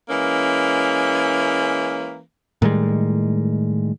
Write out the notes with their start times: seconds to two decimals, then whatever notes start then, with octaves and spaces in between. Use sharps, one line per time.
0.09 E3 G#3 A#3 C#4
2.62 A2 D#3 G3 G#3